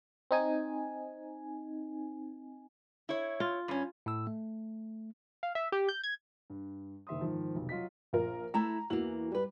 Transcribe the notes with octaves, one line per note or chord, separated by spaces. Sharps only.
C4 D#4 G#5
E4 C#5
F4
G2 C#4
A2 E6
A3
F5
E5
G4
G6
G#6
G2
F#1 D#3 E5 C6 D#6
G#2 D#3 F3
F1 B1
F#3 F4 D#5 B6
A#1 F4 A#4
A3 E4 A5 A#5
E2 E3 A#3 F#4 F#7
G2 G3 B4